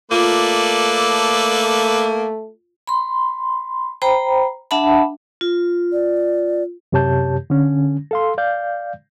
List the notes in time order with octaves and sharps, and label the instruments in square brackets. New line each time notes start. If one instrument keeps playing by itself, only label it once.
[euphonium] A3 [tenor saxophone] A#3 [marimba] F4 [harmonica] A4 B4 D5
[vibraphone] B5 C6
C5 G5 A#5 B5
D4 E5 F#5 A5 B5
F4
[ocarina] D5
[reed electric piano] F#2 C3 G4 C#5 A5 G6
D3 C#4
A4 F5 C6
D5 F5 G6